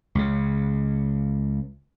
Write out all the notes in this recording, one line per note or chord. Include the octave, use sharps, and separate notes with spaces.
C#2 C#3